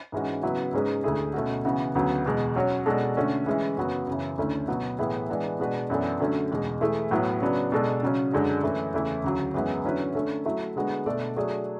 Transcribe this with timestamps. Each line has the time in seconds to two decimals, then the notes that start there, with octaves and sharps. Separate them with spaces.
0.12 G#2 E3 G#3 C#4 F#4
0.43 C#3 F#3 B3 E4 B4
0.73 G#2 G#3 C#4 G#4 B4
1.04 D2 D3 A3 E4 G#4
1.34 B2 A3 C#4 F#4
1.65 C#3 E3 B3 F#4
1.95 D2 C#3 F#3 B3
2.25 E2 B2 G#3
2.56 F#3 C#4 F#4 C#5
2.86 B2 G#3 D4 F#4 A4
3.16 D3 A3 C#4 F#4
3.46 E3 G#3 C#4 E4
3.77 F#2 C#3 F#3 B3 F#4
4.07 F#2 C#3 E3
4.38 D2 D3 A3 C#4 E4
4.68 B2 F#3 B3 F#4
4.99 A2 E3 B3 E4 G#4
5.29 E3 G#3 B3 D4
5.60 B2 G#3 D4 F#4 B4
5.90 F#2 E3 B3 D4 A4
6.20 D3 F#3 A3 C#4
6.51 E2 B2 G#3
6.81 E3 A3 E4 G#4
7.11 A2 F#3 B3 E4
7.42 C#3 F#3 B3 D4
7.72 B2 G#3 D4 A4
8.03 C#3 F#3 C#4
8.32 F#2 D3 G#3 D4 F#4
8.63 F#2 E3 A3
8.94 E2 C#3 E3 A3 E4
9.24 D2 C#3 F#3
9.54 F#2 E3 G#3 B3 E4
9.84 D3 F#3 C#4 E4 B4
10.15 D3 A3 C#4
10.46 F#3 A3 E4
10.76 D3 G#3 B3 F#4
11.06 B2 A3 D4 A4 D5
11.36 F#3 A3 D4 G#4